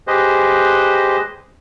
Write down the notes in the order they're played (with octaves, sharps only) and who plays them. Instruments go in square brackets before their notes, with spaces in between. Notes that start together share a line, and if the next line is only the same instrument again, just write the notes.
[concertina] G4 G#4 B4 C5 D#5